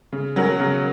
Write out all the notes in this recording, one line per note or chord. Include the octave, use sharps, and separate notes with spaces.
C#3
F#3 C#4 F#4 A#4
C#3